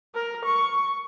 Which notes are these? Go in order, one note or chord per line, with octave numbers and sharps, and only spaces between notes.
A#4
C#6